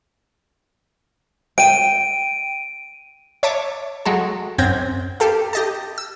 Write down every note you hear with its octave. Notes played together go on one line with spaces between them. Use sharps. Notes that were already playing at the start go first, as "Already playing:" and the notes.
G5 D7 D#7
C#5 E5 A5 D6
F#3 G#3 A4
F#2 C4 G5 G#6 A#6
G4 A4 F5
G4 D#5 A5
E6